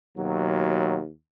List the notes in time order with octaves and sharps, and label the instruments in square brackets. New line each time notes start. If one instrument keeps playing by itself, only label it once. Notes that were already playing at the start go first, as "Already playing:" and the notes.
[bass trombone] D#2 [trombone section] B2 F#3